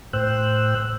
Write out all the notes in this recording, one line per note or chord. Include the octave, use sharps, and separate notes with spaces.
A2 C5 G5 E6 F#6